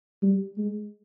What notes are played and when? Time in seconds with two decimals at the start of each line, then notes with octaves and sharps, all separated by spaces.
0.22 G3
0.58 G#3